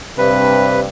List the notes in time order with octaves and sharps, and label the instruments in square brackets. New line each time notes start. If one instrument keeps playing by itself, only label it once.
[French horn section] G2 C3 [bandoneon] B4